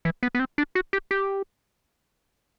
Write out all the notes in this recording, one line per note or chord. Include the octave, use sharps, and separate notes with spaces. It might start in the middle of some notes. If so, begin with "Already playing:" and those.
E3
B3
B3
C4
D4
F#4
G4
G4